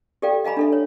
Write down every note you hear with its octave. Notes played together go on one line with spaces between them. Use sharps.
G4 A4 D5 F5 G5
D#5 F5 G#5 A#5 B5
D4 A4 E5
C#5